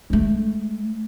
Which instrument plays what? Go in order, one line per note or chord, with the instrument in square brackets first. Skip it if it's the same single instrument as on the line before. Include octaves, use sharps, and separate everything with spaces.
[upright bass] G#3 A3